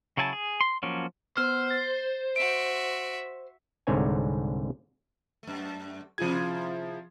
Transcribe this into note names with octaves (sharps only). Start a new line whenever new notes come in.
C#3 F#3 E4 G#5 A5
G#4
C6
F3 F#3 A#3 C#4
B3 C5 F6
A6
F#4 E5 D7
C2 G#2 D3 C4 C#5 G#5
F#2 A3
C3 F3 E4 F4 G#4 G#6